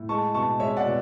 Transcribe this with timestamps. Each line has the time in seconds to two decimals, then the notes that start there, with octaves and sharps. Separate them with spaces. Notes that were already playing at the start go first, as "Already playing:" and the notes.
Already playing: A2
0.09 G#3 A5 C#6
0.34 B2 A5 C#6
0.60 G#3 C#5 E5
0.77 D5 F#5
0.85 B2